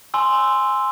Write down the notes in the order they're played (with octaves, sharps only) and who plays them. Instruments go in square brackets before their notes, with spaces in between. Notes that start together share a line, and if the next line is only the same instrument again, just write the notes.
[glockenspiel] G#5 C6 E6